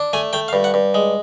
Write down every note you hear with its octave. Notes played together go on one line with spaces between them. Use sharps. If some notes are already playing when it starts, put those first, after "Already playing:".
Already playing: D4
A3 G#5
A3 G5
F5
G2
F#5
G2
G#3